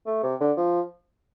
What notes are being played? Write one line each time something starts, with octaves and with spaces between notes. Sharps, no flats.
A3
C3
D3
F3